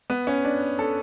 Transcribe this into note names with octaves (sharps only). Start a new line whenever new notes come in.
B3
C#4
D4
A4